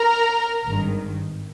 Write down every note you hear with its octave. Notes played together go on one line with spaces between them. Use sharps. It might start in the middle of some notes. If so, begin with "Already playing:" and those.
Already playing: A#4 A#5
G#1 G2 D#3